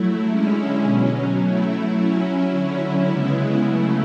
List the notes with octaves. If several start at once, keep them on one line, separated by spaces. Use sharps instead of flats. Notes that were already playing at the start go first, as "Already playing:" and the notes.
Already playing: F#3 A3 E4
D3 G#3 C#4 E4
B2 F#3 C#4
F#3 A3 E4
F#3 C#4 E4
D3 F#3 C#4 E4
C#3 G#3 B3 E4
C#3 F#3 A3 E4